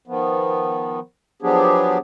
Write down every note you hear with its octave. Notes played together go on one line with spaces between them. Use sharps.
D#3 F3 B3
F3 F#3 B3 D4 G4 G#4